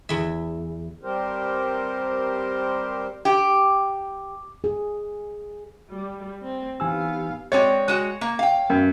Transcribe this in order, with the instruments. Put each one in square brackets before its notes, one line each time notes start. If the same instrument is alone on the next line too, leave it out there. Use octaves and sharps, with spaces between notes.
[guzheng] E2 E5
[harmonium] G3 C4 G4 A#4 C5
[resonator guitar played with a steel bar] G4
[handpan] G#4
[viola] G3
C4
[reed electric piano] E3 G#5 E6 [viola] B3 F5 [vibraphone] D#4 G4
[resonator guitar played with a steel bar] G#3 C4 D5 [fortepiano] C#5
[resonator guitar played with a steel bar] G#3 F#4
A#3
F5 G5
[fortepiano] F#2